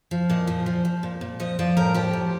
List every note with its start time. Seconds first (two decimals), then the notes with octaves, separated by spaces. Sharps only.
0.11 F3
0.30 A#2 D#5
0.47 F3
0.66 F3
0.85 F3
1.03 A#2
1.21 A#2
1.40 F3 D#5
1.59 F3 D5
1.77 A2 A#4
1.94 F3 G4
2.13 A2